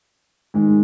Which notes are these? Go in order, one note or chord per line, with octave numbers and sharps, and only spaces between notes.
G#2 D#3 G#3